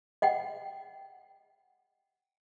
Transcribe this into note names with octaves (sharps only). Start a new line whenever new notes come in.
D#5 F#5 G5